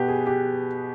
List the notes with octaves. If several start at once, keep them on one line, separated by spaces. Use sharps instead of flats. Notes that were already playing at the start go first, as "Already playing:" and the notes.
Already playing: B2 G4 B4
G#4
G4